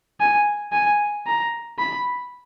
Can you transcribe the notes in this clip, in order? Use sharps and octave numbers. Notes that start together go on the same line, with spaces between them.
G#5
G#5
A#5
B5